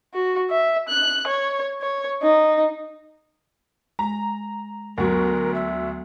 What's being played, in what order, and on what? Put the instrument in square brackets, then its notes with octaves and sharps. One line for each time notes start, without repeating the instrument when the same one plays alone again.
[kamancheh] F#4
E5
F#6
C#5
C#5
D#4
[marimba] G#3 [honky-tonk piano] A#5
[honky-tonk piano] D2 F#4 [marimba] F#3 A3 B3 [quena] A#4
[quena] E5